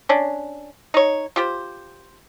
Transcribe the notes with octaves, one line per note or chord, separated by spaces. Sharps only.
C#4 D4
D#4 C#5
F4 G4 C5